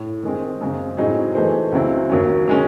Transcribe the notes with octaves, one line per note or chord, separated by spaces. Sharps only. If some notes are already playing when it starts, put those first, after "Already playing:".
Already playing: A2
D#3 G#3 C4
F#2 C#3 G#3 C4
A2 F#3 C4 D#4 G#4
E3 A3 D#4 G#4 C5
C#2 C#3 F#3 C4 E4
D#2 D#3 F#3 C#4
D#3 G#3 C#4